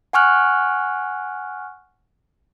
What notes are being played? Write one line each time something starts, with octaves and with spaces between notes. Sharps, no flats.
F#5 G#5 C#6 F6 F#6